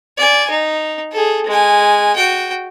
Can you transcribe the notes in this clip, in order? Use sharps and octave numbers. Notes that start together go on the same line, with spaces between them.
D5 G#5
D#4
G#4 A4
G#3 G#5
F#4 G5